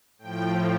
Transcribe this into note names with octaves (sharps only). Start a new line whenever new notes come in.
A2 F3 G5